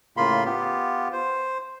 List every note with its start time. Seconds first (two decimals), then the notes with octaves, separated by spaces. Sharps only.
0.17 A2 C#3 A#3 F4 B5 C6
0.45 B3 F4 G4
1.12 C5